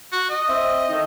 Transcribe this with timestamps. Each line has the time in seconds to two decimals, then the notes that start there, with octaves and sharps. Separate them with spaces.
0.12 F#4
0.30 D#5
0.47 C4 E5
0.90 D#3 A3 D#4